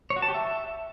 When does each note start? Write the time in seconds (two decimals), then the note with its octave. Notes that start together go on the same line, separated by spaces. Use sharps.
0.10 C#5
0.16 F#4
0.22 A5
0.28 G4
0.34 E5